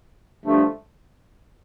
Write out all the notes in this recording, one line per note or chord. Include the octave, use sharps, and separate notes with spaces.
G2 D3 F3 A3